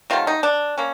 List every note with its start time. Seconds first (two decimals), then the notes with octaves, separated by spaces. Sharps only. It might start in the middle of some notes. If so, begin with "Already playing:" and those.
0.10 C3 D#3 F#3 A3 F4
0.27 D#4
0.43 D4
0.78 A#3 C#4